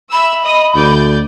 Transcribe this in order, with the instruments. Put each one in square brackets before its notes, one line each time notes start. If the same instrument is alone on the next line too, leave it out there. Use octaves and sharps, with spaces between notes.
[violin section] E5 E6 [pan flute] B5
[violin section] D#5 D#6
[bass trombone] D2 [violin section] D5 G6